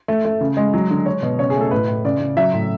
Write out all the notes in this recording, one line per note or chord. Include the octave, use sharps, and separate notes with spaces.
A3
A3
C#3
G#3
F#3
D3
G#3 C#5
B2
C#3 C#5
G#4
A3
A4
A2 B4
A2
C#3 D5
C#3
F#3 E5
A2